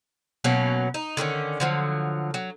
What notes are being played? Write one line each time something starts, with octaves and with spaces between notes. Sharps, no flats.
B2 F#3 A#3 C#4
D#4
D3 D#3 B3 C#4
D3 F3 F#3
F#3